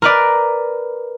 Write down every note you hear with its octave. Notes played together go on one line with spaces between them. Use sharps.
A#4 B4 D5